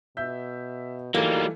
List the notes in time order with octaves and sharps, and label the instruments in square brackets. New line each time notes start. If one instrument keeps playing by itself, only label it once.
[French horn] B2 [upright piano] E5 G6
[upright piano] E3 A3 [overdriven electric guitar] F#3 G3 [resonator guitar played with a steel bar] A#3 [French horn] D#4